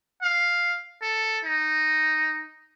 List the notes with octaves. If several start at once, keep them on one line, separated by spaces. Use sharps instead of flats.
F5
A4
D#4